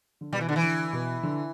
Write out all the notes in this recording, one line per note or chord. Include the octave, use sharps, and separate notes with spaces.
D3
B2 G3
E3
D3
E3
D3
B2
D3